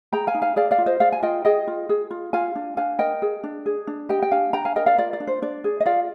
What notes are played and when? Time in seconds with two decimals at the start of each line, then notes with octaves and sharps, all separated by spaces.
0.12 G#4 G5 A#5
0.27 F5 G#5
0.34 D#4
0.42 F5 G#5
0.56 G#4 D5 F5
0.71 D5 F5
0.78 F4
0.86 C5 D#5
1.00 G#4 D5 F5
1.12 G#5
1.22 F4 D#5 G5
1.45 G#4 D#5 G5
1.67 F4
1.89 G#4
2.11 F4
2.33 F4 F5 G#5
2.55 D4
2.77 D4 F5 G#5
2.99 A#4 D#5 G5
3.22 G#4
3.44 D4
3.66 G#4
3.87 D4
4.09 G4 D#5 G5
4.22 G5
4.31 D4 F5 G#5
4.53 D4 G5 A#5
4.65 F5 G#5
4.76 A#4 D#5 G5
4.86 D5 F5
4.98 F4 D5
5.13 D5
5.20 D4
5.27 C5
5.42 D4 D5
5.64 G#4
5.80 D#5
5.86 F4 D5 F5